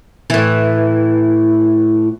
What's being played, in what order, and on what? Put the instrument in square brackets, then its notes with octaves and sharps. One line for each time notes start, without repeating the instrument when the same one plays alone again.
[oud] A2 E3